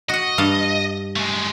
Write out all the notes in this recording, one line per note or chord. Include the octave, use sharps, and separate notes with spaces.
F#4 D#5 F#5
G2 F5 A5
G#3 A3